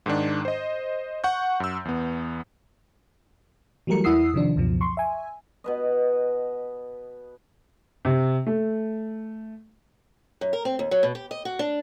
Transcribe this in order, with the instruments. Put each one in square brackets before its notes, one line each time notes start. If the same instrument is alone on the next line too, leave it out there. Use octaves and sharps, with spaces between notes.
[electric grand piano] G#2 D#3 D4
C5 D#5
F#5 C#6 G6
F#2 E6
E2 B3
[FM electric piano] E3 F#3 G3 A3 A#4 C#7
E2 E4 F#5 D#6 E6 C7
C3 D#3 F3 D4
C#2 F#2 B2 F3
C6 C#6
E5 G#5
[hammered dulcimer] B2 B4 D#5
[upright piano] C3
A3
[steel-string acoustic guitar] F#2
A#4
C4
D#2
F#3
B2
G4
D#5
F#4
D4